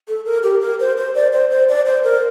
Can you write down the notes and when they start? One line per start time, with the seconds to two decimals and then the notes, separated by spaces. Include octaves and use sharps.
0.08 A4
0.26 A#4
0.43 G4
0.62 A#4
0.80 C5
0.97 C5
1.15 D5
1.33 C5
1.51 C5
1.69 D5
1.86 C5
2.04 A#4